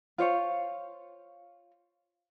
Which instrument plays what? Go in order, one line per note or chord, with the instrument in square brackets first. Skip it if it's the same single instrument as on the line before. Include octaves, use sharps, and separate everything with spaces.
[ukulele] F4 C5 C#5 F5